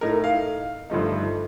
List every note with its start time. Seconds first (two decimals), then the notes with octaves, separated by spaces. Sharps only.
0.01 A2 A3 D#4 A#4
0.24 F5
0.90 G2 D3 F3 A3 D#4